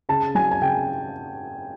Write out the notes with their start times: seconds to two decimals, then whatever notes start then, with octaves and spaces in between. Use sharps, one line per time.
0.09 C#3 A5
0.35 F#3 G#5
0.52 G#5
0.62 C#3 G5